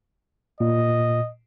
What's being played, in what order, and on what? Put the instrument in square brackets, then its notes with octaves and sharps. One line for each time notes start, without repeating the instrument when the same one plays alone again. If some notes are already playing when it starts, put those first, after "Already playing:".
[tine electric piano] A#2 [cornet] D#5